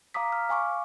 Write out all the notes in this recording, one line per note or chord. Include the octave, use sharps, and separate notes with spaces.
F5 A#5 D6 D#6 B6
F6
F5 G#5 C#6 D6